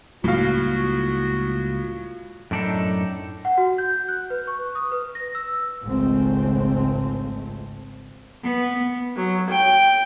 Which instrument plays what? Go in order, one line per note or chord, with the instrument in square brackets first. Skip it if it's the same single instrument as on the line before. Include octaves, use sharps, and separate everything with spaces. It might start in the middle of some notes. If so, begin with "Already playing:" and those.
[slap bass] C#2 G3 A#3 [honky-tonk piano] A2 F5 [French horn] F4 [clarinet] F#4
[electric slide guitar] F#2 A2 D4 D#4 A4
[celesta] F#5
F#4
G6
F#6
B4
C#6
D#6
B4
A#6
E6
[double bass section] G#1 C#2 A3 C4
[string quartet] B3
F#3
G5